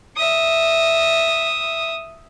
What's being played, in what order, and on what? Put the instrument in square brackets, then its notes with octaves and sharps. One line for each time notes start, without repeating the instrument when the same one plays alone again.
[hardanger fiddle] E5 D#6